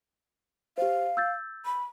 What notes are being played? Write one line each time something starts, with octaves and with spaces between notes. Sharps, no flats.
G4 C5 F5
E6 G6 A6
B5